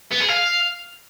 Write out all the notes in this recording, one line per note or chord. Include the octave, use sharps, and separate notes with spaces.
B3
G#4
F5